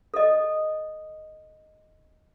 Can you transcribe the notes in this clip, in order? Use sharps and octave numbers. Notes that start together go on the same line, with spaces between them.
A4 D#5